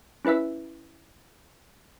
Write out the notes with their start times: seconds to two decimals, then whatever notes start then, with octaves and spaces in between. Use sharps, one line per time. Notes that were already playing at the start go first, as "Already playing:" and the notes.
0.25 C#4 E4 B4 E5 E6